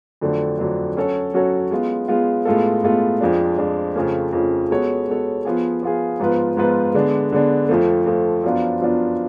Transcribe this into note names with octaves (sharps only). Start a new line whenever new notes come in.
F2 D3 F#3 A3 D4
F2 D3 F#3 A3 D4
F#3 C#4 F#4 A4 C#5
F#3 C#4 F#4 A4 C#5
G#3 B3 F4
G#3 B3 F4
A2 G#3 B3 F4 A4
A2 G#3 B3 F4 A4
F2 F3 G#3 D4
F2 F3 G#3 D4
F2 C#3 F3 A3 C#4
F2 C#3 F3 A3 C#4
G#3 B3 F#4 A4 C#5
G#3 B3 F#4 A4 C#5
F3 B3 F4 G#4
F3 B3 F4 G#4
G#2 F3 B3 F4 B4
G#2 F3 B3 F4 B4
D3 G#3 B3 D4
D3 G#3 B3 D4
F2 F3 A3
F2 F3 A3
F#2 F3 B3 D4 F4
F#2 F3 B3 D4 F4